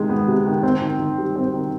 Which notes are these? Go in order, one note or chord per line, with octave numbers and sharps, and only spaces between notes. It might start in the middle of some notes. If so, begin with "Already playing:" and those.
Already playing: C3 D#3 G#3
B3
C3
D#3
C4
D#3
D#3
G3
C4
D#3